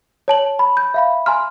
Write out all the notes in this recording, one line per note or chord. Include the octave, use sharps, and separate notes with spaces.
C#5 A5 F#7
B5
G6
E5 F5 B5
G#5 A#5 C6 F6